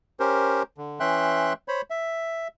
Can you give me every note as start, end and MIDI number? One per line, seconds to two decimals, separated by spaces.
0.20 0.63 61
0.20 0.63 67
0.20 0.63 70
0.20 0.63 72
0.78 0.99 50
1.00 1.53 52
1.00 1.53 61
1.00 1.53 76
1.00 1.53 79
1.00 1.53 84
1.00 1.53 90
1.68 1.82 72
1.68 1.82 73
1.68 1.82 83
1.90 2.48 76